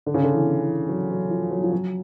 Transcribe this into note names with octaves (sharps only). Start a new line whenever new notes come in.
D3
C#3
D3
E3
E3
F#3
F#3
F3
F#3
F3
F#3